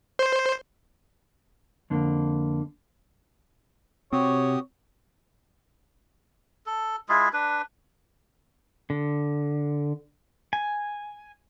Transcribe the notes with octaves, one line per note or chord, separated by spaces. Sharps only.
C5
F2 D3 A#3
C3 C4 F#4 G4 C#5 D#6
A4
G#3 E4 F4 G#4
D4 B4
D3
G#5